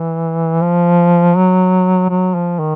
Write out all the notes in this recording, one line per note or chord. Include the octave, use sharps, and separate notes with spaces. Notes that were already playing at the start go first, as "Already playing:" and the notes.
Already playing: E3
F3
F#3
F#3
F3
D#3